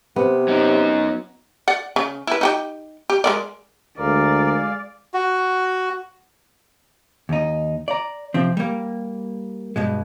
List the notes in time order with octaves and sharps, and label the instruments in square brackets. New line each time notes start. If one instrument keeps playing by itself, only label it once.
[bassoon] C3 [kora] B3 [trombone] C4
[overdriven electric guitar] F#2 F#3 [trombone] D#4
[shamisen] D5 F#5
C#3
E4 B4
D#4 F#4 G4
G4
G#3 A#4 D5
[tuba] D2 [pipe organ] G#3 G#4 F5 [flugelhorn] A#4 [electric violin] D5
[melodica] F#4
[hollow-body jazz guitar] D#2 D#4
D5 A#5
C3 F3 C4
G3 A#3
G2 B2 G#3